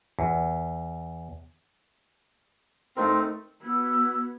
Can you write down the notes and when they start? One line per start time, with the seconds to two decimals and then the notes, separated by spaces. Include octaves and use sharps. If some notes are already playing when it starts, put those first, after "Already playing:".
0.19 E2
2.97 A3 C4 D#4 A#4
3.62 B3 F#4 E6 G#6